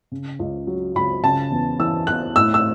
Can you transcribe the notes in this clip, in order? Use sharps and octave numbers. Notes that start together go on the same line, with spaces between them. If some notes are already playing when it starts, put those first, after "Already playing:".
C#3
C#2
F#3
C#2 B5
C#3 A5
E2
E3 E6
E2 F#6
A2 E6
E6